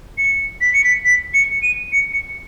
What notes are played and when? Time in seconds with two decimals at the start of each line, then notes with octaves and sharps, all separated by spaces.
0.18 C#7
0.61 B6
0.73 C#7
0.84 B6
1.05 B6
1.34 C#7
1.62 D#7
1.92 C#7
2.13 C#7